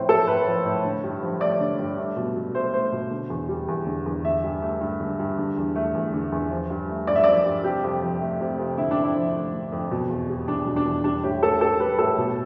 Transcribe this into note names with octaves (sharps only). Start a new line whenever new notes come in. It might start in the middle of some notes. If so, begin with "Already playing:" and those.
Already playing: A2 F3 C4
A3 A4
A2 B4
F3
A2
D3
G2
F3
A3 D5
D3
G2
A3
B2
B2
A3 C5
A3 C5
B2
D3
E2
G3
E2
D3
E2
D3 E5
G2
A3
G2
D3
G2
D3
E2
A3
E2
D3
E2
F3
G2
A3
G2 D5
E5
F3 D5
G2
C3 G4
F2
F3
A3
C3
F2
D3 E4
D4
F2
E4
F3
A3
D3
F2
B2
E2
G3
E2 D4
B2
D4
E2
G3 D4
A2 G4
A2 A4
G3 A4
G3 B4
A2 A4
B2